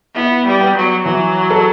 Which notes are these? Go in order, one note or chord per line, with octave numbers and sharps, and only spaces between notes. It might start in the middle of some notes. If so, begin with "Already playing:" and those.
B3 E4
G3
B3
F#3
E3 F#3
A4